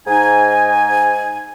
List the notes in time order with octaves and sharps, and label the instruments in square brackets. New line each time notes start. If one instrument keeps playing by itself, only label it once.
[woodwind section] G#2 D#4 G#5